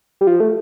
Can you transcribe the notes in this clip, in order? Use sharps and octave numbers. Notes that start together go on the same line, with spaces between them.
G3
F3
A3